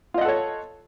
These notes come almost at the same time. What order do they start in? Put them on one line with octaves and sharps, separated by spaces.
F4 D#5 F#5 A4 C#5